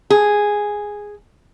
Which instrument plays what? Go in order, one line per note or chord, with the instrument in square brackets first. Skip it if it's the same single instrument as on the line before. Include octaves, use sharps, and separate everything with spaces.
[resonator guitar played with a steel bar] G#4